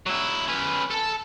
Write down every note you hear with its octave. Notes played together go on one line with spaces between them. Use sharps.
F#3 E4
C#4 B4
A4 A5